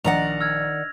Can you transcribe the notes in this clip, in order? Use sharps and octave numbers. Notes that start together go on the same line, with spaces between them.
A#1 D#3 D5 F#5 A#5 A#6 F7
E6 F6 G#6